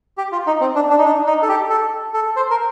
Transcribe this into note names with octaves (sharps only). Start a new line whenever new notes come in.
G4
F4
D#4
C4
D4
D4
D#4
D4
D#4
A4
G4
A4
A4
C5
A#4